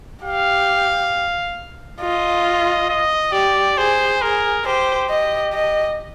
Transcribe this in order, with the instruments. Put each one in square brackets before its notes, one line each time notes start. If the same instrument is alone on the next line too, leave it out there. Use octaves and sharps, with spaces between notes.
[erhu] G4 [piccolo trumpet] F5
[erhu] F4 [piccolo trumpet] D#5
[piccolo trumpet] D#5
[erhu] G4 [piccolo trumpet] D5
[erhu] G#4 [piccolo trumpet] C5
[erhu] G#4 [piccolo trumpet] A#4
[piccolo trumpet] G4 [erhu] C5
[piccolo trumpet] G4 [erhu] D#5
[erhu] D#5